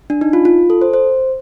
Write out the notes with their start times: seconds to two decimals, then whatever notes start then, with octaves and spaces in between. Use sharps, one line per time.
0.10 D4
0.21 D#4
0.33 F4
0.45 F4
0.70 A4
0.82 C5
0.93 C5